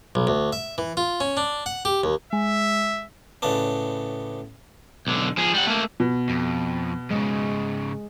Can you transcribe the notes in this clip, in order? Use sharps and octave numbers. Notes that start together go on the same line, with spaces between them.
B1
D2
E5
E3
F4
C#4
D4
F#5
G4
D#2
G#3 E5
A2 C#3 B3 D4
B1 D3
F3 G#4
G3 F#5
A3 A#3
B2
F2
G#2 C#3 G#3